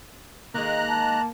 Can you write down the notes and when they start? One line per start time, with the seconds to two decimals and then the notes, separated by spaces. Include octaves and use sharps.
0.54 D#3 G#3 A#3 A#5 F#6
0.89 A5